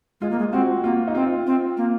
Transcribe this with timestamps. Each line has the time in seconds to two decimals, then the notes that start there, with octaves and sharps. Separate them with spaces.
0.21 G#3 F4
0.31 A#3
0.39 G#3
0.52 C4 F#4
0.84 A#3 F4
1.08 D#4
1.15 C4 F4
1.47 C4
1.77 A#3